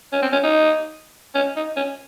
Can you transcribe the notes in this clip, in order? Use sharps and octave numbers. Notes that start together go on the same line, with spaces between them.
C#4
C4
C#4
D#4
C#4
D#4
C#4